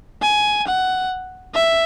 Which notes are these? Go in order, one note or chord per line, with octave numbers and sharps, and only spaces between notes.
G#5
F#5
E5